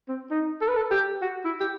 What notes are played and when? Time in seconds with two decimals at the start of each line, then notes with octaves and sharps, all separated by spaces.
0.08 C4
0.31 D#4
0.61 A4
0.68 B4
0.77 A4
0.91 G4
1.22 F#4
1.45 E4
1.60 G4